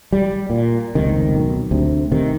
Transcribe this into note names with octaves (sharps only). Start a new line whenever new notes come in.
G3
A#2
F1 C#2 C3 D#3
B1
D2 C3
C3 D#3